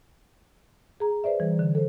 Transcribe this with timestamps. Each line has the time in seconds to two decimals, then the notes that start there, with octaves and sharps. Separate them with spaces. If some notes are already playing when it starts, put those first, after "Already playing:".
1.00 G#4 A#5
1.24 B4 C5 D5 E5
1.40 E3 G3
1.59 D3
1.75 A4 C5